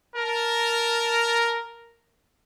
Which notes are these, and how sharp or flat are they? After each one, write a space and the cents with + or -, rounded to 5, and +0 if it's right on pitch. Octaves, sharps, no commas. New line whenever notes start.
A#4 +0 A5 +0